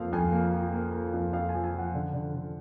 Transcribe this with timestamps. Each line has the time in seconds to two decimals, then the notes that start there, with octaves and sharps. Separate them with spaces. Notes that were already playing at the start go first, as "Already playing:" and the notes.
Already playing: F2 F3 A#3 F5
0.12 F2 G#5
0.32 A#3
0.53 F3
0.73 A#3
0.93 A#3
1.13 F2
1.33 F2 F5
1.49 G#5
1.54 F3
1.64 G#5
1.74 F3 F#5
1.94 D3
2.13 D3
2.34 D3